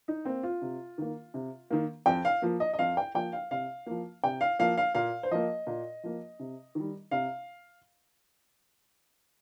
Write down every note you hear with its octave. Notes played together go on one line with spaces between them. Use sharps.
D#4
A#3 C4
F4
C3
D#3 A#3
C3
D#3 A#3
F2 G5
F5
F3 A#3
D#5
D#5
F2 F5
G5
F3 A#3 G5
F5
C3 F5
F3 A#3
C3 G5
F5
F3 A#3 F5
F5
A#2 F5
C5
F3 A#3 D#5
A#2
F3 A#3
C3
D#3 G3
C3 F5